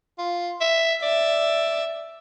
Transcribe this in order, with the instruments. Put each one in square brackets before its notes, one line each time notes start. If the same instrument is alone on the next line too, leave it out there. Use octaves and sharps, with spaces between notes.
[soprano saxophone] F4
E5
[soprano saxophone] D5 [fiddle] E5